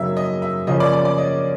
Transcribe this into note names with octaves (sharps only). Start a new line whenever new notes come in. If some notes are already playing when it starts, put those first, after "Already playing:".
Already playing: F#2 C#3 F#3 A#3 D#4 E5
D#5
E5
C#3 F3 A#3 C#4 D#5
D5
D5
D5
D#5